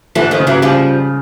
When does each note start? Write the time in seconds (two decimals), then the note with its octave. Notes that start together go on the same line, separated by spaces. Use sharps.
0.15 D3 E3 F3
0.31 D#3 F3
0.40 C#3
0.47 E3 F#3
0.62 C#3 F3 G3